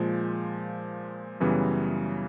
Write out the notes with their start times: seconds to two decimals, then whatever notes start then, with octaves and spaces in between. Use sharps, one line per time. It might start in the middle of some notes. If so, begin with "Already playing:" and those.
Already playing: A#2 F3 G#3
1.40 F#2 C#3 E3 G3 B3